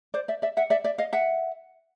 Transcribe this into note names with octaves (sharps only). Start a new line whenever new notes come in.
C5 D5
D5 E5
D5 E5
E5 F#5
D5 E5
D5 E5
D#5 F5
E5 F#5